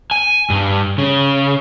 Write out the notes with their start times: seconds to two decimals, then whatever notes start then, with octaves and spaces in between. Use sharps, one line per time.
0.11 G#5
0.50 G2
0.98 C#3